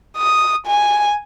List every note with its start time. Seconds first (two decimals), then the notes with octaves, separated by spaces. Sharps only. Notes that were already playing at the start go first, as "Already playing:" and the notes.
0.17 D#6
0.66 G#5